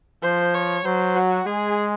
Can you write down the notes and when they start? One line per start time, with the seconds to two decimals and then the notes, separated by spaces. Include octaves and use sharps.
0.23 F3 C5
0.54 C#5
0.85 F#3 C5
1.16 F#4
1.46 G#3 G#4